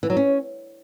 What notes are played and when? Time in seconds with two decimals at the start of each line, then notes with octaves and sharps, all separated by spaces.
0.03 E3
0.10 F#3
0.17 C#4